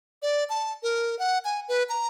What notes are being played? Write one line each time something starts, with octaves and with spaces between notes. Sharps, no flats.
D5
A5
A#4
F#5
G#5
B4
A#5